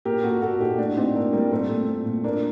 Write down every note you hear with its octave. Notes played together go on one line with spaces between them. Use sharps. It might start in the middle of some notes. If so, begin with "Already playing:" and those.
A#2 G4 A#4
A#2 F#4 A4
A#2 F#4 A4
A#2 D#4 G4
A2 D4 F#4
A2 C4 D#4
A2 A#3 D4
A2 G3 A#3
A#2 A3 C4
A#2
A#2
A#2
A#2 A#3 D4